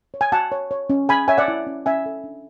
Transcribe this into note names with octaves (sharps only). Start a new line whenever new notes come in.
C#5
G#5
F#4 F#5 A5
C#5
C#5
C#4
G#4 G#5 B5
C#5 E5 G#5
D5 F#5
E4
C#4
C#4 E5 G#5
A4
D4